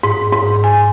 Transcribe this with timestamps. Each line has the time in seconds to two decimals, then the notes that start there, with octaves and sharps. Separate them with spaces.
0.03 G#2
0.33 G#2
0.64 G#5